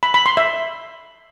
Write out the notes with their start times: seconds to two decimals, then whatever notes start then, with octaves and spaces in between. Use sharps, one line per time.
0.03 B5
0.14 B5
0.26 C6
0.37 E5